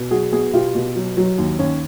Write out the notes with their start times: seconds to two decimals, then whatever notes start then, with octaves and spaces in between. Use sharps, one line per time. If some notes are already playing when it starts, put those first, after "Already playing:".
Already playing: B2
0.11 F#3 F#4 G#4
0.32 B3 F#4 G#4
0.53 B2 F4 G4
0.75 B2
0.96 F#3
1.17 F#3
1.38 D#2
1.59 D#2 C#4